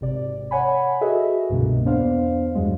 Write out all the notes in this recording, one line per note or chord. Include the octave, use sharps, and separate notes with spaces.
G#1 C3 D5
C#5 F#5 G#5 B5
F#4 G#4 A4 B4 D#5 E5
C2 G2 B2 D3 A#3
E2 B3 D4 C5 F5
E2 G2 F#3 G#3